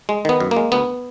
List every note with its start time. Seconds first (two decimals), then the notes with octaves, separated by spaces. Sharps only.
0.09 G#3
0.25 D#3 B3
0.40 F#2
0.51 A#3
0.56 G#3
0.72 D2 B3